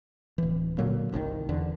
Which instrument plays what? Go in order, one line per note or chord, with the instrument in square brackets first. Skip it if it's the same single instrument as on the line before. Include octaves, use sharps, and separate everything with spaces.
[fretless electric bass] D1 E3
A#2 D3 F#3 A#3
G1 C2 C3 D#3
E2 D3